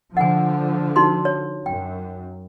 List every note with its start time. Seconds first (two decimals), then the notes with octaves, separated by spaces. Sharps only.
0.17 D3 F3 F#5 G#5
0.96 D#4 F#4 C6
1.25 C#5
1.66 F#2 G5